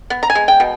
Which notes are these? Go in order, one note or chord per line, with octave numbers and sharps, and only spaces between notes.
B3
A#5
G#5
G#3
G5
B2